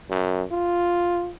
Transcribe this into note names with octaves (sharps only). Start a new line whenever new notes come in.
F#2
F4